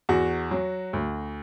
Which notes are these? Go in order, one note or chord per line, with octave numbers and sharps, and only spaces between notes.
E2 F#4
F#3
D2